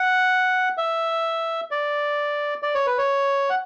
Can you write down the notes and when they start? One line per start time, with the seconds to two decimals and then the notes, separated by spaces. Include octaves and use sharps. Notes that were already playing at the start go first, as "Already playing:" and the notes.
Already playing: F#5
0.77 E5
1.71 D5
2.63 D5
2.75 C#5
2.86 B4
2.98 C#5
3.50 F#5